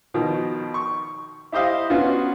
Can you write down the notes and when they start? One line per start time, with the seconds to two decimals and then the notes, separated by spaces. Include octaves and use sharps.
0.14 B2 D#3 F3
0.74 C#6
1.52 E4 G4 C5 D#5 F5
1.90 B3 C#4 D4 F4 F#4